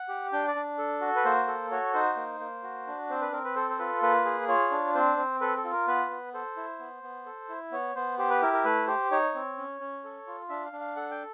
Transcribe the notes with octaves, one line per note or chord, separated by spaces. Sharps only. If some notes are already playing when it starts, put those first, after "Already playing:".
Already playing: F#5
G4
D4 G5
D5
D4
A4
F#4
B4
A#3 C5
A4
F#4 C#5
D#4 C5
A#3
A#3
F#4
D4
C4 C5
B4
C4 A#4
B4
A4 C5
C5
F4 B4
A#3 B4
G#4
F4 C#5
D4
C4 C5
C4
A4 B4
A4
F4
A#4
B3 B4
B3
A4 C5
E4
B3
B3
A4
E4
B3 C#5
B3 C5
G4 C5
B4
E4 A#4
A#4
A3 B4
G4 C5
D#4 C#5
C4
C#4
C#4
A4
F4
D4 E5
F5
D4
F5
A4 F#5
G5